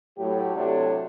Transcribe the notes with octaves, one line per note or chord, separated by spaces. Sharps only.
A2 F#3 G4
A2 C3 F#3 A3 D4 C#5